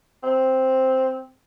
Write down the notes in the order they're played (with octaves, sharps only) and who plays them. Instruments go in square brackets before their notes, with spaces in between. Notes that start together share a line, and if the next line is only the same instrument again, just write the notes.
[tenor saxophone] C4